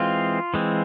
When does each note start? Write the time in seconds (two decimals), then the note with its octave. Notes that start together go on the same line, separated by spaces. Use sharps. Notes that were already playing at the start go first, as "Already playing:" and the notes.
Already playing: E3 G#3 C4 F4
0.54 E3 G#3 C4